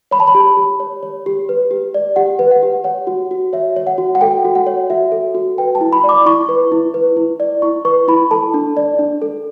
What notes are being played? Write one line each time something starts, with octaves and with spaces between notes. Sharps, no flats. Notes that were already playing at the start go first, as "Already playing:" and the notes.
C#5 B5
A5
B5
G4
G4
C#5
C#5
G4
B4
G4
D5
G4 F#5
B4
F#5
G4
C#5 F#5
F#4
F#4
C#5 E5
C#5
F#5
F#4
F#5
A4 G5
F#4
F#5
C#5
F#4 E5
A4
F#4
B4 G5
A5
E4
B5
D5
D6
E4 C#6
B4
E4
B4
E4
D5
E4 C#6
B4 C#6
E4 B5
A4 A5
D4
D5
D4
A4